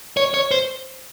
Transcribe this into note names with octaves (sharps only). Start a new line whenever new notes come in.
C#5
C#5
C5